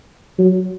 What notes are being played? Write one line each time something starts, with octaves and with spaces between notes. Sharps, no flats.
F#3